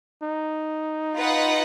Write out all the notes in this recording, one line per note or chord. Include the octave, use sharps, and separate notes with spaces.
D#4
F4 B4 D#5 F#5